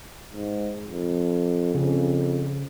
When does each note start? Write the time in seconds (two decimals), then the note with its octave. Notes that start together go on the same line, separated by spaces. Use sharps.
0.33 G#2
0.88 F2
1.75 F2 C#3